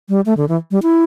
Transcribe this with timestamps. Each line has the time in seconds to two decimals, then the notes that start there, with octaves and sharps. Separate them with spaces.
0.09 G3
0.26 A3
0.37 D3
0.49 E3
0.71 G3
0.83 E4